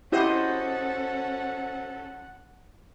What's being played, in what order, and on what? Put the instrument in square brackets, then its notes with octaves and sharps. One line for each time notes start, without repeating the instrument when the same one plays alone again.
[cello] C#4 A4 [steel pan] E4 G4 [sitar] F#4 C5 D#5 [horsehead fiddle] F#5